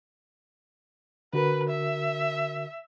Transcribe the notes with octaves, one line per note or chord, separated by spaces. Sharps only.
D3 F#4 A#4 B4
E5